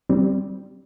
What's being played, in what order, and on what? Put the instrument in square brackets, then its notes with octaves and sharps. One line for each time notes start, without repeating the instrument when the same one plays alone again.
[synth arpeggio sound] G3 C4